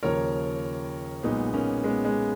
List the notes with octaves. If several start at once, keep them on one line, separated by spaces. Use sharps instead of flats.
D#2 C#3 F3 A#4 C#5
B1 A#2 G#3 B3 D#4
A#3 C#4
G#3 B3
G#3